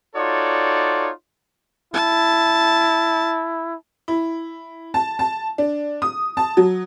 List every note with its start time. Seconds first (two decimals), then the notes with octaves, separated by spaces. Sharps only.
0.16 D#4 F4 F#4 A4 C#5 D5
1.94 E4 A5
4.08 E4
4.94 A5
5.19 A5
5.58 D4
6.02 D#6
6.37 A5
6.57 F#3